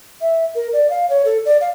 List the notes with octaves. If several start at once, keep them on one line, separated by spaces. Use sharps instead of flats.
E5
A#4
D5
F5
C#5
A4
D5
F5